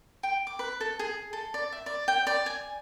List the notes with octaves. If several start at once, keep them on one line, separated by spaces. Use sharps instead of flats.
G5
D6
B4
A4
G#4
A4
D5
E5
D5
G5
D5
G#5